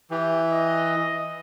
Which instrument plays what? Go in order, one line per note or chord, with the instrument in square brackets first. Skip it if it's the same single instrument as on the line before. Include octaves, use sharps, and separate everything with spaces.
[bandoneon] E3 [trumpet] G4
[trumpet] D#5